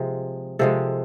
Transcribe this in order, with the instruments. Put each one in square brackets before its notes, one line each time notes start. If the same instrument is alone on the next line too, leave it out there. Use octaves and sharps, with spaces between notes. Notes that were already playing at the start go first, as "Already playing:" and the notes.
Already playing: [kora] C3 F3 G#3
C3 F3 G#3 A4